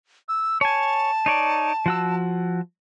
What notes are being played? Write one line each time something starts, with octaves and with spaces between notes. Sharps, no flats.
E6
C#5 G#5 A5
D#4 C#5 D5
F3 F#4 E6